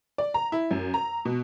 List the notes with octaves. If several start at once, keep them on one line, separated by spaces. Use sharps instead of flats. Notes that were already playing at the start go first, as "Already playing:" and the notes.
D5
A#5
E4
F#2
A#5
B2